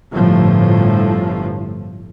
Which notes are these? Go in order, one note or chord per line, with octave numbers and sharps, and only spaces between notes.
G1 A2 F3